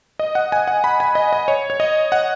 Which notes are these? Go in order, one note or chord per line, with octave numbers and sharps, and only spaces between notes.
D#5
F#5
G#5
F#5
B5
G#5
D#5
D#5
C#5
C#5
D#5
F#5